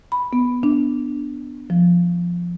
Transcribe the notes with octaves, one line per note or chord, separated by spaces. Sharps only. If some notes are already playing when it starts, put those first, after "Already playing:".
B5
B3
D4
F3